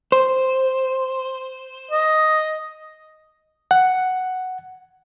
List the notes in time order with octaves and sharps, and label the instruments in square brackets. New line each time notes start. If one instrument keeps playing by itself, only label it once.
[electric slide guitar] C5
[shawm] D#5
[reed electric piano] F#5